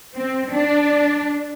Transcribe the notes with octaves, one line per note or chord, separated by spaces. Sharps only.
C4
D4